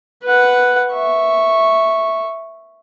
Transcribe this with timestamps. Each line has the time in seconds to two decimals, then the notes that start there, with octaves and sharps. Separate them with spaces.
0.24 B4 F#5
0.93 E5 C#6